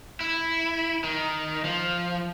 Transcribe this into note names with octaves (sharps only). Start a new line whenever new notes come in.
E4
D#3
F3